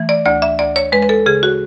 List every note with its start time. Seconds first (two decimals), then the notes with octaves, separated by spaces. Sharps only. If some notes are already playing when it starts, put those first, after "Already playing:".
Already playing: E3 A3
0.09 D5
0.26 D2 D5
0.42 E5
0.59 D2 D5
0.76 C#5
0.92 G#3 B4
1.02 B4
1.09 A4
1.26 C#3 G#4
1.43 F#4